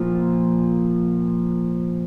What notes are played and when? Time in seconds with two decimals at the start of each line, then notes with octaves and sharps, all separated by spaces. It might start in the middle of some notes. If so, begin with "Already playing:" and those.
Already playing: A#2 F3